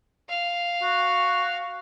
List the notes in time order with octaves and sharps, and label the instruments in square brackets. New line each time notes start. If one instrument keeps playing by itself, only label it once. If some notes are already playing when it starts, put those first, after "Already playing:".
[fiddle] F5
[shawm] F#4